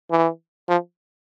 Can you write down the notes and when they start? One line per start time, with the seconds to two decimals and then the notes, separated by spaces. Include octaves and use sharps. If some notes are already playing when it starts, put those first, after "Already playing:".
0.11 E3
0.68 F3